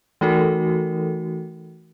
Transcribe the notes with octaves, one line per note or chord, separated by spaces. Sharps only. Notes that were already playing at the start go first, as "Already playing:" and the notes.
E3 A3 D#4 F#4 A4 A#4